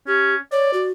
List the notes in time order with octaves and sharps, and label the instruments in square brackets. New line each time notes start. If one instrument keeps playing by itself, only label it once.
[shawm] C#4 [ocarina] G4
[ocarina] C#5 [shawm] D5
[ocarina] F#4